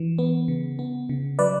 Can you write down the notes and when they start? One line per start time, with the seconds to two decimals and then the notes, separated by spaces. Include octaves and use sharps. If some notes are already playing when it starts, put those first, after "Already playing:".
Already playing: E3
0.18 B3
0.48 C#3
0.79 B3
1.09 C#3
1.39 F#3 B4 D5